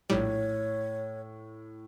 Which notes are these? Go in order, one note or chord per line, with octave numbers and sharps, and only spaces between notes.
A#1 A2 G3 C#5